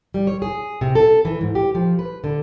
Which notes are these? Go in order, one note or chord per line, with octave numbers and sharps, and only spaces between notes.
G3
C#5
G#4
C3
A4
E3
G#2
G4
F3
B4
D3